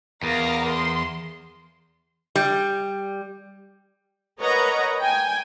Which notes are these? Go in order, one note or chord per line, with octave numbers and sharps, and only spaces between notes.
E2 A#4 F5
C6
G3
A#4 B4 C#5 D#5 F#5 A#5
G5 G#5